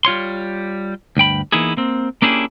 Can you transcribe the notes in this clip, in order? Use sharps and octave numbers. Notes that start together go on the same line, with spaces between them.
G3 F4 C#5 C6
D2 G2 G5 B5
E3 A#3 B3 D#4 E4 G#4
A#3 C4
A#3 C#4 D4 E4 G4 G#4